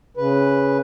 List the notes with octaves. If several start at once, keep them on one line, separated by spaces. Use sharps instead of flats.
C#3 B4